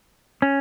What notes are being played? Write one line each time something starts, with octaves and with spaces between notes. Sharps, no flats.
C#4